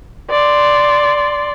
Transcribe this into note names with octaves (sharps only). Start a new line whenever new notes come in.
D5 C6